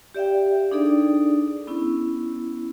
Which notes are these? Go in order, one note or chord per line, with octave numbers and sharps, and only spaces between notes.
G4 D5 E5 F5 G5
D4 D#4 G#4 A4 D5
B3 C#4 E4